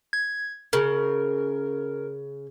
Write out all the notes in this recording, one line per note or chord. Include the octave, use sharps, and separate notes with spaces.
G#6
C#3 A#4